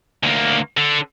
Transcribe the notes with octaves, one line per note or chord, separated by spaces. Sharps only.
D2 A#3
D3